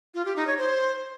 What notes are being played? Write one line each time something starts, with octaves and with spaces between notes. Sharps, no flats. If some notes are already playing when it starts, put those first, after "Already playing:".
F4
G4
D#4
C#5
C5